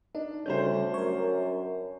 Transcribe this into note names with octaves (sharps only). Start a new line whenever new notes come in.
D4 D#4
D2 C#3 G3 C#4 D4 C5 G6
F#2 A#4 C#5